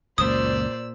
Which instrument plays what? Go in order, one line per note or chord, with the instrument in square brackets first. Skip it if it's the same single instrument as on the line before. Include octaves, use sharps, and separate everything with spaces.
[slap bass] C#2 F#2 [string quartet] A#2 E6 [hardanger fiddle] C5 D5 [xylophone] D#6